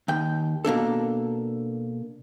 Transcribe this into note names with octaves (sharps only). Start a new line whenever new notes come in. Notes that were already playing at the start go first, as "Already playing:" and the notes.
D#2 G5
B2 A#3 D4 A4